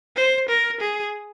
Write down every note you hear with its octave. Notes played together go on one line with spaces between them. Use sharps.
C5
A#4
G#4